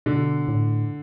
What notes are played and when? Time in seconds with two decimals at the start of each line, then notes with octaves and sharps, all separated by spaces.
0.06 B2 D3
0.48 A2